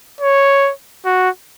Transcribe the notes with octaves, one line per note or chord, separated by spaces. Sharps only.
C#5
F#4